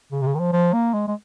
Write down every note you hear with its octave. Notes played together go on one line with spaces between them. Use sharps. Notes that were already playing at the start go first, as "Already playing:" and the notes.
C#3
C3
C#3
D#3
F3
F3
A#3
G#3
G#3